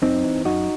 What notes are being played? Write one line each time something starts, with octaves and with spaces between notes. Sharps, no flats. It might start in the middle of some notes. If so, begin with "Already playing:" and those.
F#2 C4 D#4
E3
F#2 D#4 F#4